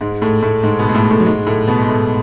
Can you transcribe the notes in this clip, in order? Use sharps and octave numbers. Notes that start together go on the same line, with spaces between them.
G#2 G#3
A2 A3
A2 A3
G#2 G#3
B2 B3
G#3
A2 A3
A2 A3
F#3
G#2 G#3
A2 A3
B2 B3
G#3
A2 A3